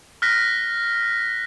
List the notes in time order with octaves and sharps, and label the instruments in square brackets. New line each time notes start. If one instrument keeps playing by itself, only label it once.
[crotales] F6 F#6 A#6 B6